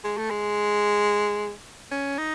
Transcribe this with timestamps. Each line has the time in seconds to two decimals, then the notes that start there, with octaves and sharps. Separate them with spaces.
0.05 G#3
0.17 A3
0.30 G#3
1.91 C#4
2.18 D#4